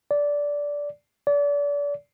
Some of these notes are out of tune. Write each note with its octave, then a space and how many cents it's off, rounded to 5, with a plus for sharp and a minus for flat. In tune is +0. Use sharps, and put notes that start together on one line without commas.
D5 -15
D5 -35